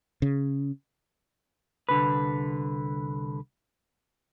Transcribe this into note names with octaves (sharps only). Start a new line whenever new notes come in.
C#3
C2 D3 B4